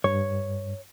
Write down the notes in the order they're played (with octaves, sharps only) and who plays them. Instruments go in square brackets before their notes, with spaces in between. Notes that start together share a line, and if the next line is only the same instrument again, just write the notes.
[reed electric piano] G2 [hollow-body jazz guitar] C#5